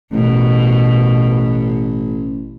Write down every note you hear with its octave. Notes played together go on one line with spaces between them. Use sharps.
A1 B2